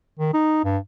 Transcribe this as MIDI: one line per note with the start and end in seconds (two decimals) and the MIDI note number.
0.19 0.33 51
0.34 0.61 63
0.64 0.78 43